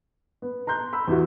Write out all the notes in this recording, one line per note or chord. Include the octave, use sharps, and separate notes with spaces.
B3
A#5 C6 F#6 G6
B5 E6
E2 E4 F#4